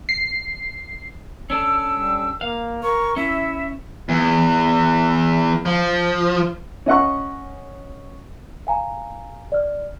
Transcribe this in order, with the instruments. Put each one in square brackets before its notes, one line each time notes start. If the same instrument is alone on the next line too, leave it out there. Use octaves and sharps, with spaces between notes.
[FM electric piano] C7
[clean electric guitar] C#4 D4 A4 [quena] E6
[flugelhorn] G3
[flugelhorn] A#3 [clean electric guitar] F5
[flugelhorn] A#4 [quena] C#6
[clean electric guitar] C#4 [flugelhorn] E4 [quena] E5
[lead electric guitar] E2
F3
[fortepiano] C#4 D#5 F#5 C#6
[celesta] F5 G#5 A#5
D5 F6